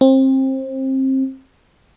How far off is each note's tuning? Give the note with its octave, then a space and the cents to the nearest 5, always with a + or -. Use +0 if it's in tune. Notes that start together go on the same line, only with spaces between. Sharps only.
C4 +25